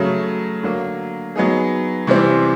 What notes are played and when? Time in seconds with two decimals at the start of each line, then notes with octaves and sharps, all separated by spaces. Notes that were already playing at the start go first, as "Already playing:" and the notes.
Already playing: C#3 F#3 A3
0.63 D3 F#3 A#3
1.36 F#3 B3 D#4 G#4
2.07 C3 E3 G3 C4